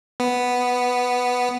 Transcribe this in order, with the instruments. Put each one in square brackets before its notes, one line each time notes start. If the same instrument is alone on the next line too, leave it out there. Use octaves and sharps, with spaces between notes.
[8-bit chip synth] B3